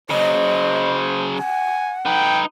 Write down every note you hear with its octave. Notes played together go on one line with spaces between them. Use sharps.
C#3 F#3 C5 D#5
F#5 G#5
D#4 B4 G5